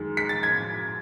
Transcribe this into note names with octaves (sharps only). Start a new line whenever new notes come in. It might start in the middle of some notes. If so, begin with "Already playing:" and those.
Already playing: F#2 D#3 G#3
B6
A6
G#6